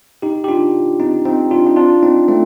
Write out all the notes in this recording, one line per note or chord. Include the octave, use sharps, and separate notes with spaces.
D#4 G4
G4
D4 F4
C4 D#4
C4 D#4
D4 F4
D#4
D4 F4
C4 D#4
A3 C4